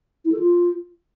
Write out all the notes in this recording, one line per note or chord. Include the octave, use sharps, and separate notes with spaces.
E4
A4
F4